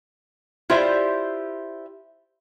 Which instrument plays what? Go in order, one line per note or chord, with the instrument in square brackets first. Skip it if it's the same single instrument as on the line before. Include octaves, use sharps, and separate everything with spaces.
[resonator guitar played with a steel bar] E4 F4 G4 C5 D5 E5